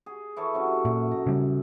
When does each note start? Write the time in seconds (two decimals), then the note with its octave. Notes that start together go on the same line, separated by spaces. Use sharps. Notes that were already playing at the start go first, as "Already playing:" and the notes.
0.06 G#4
0.36 E3 A4 C#5
0.54 C3 F#3 C#4
0.85 F#2 A#2
1.11 A#5
1.27 C#3 G3